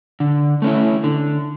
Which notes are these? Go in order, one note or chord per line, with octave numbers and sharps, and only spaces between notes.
D3
A3 C#4 E4
D3